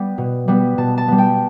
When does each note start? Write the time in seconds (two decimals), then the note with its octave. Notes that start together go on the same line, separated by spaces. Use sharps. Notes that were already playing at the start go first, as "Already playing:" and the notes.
Already playing: G3 B3
0.18 B2
0.48 G3 B3
0.78 B2 A5
0.98 A5
1.08 G3 B3
1.18 G5